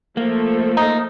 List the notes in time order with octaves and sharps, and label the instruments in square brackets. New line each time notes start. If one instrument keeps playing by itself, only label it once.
[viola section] F3 A3 A4 [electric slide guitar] A#3
[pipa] D#4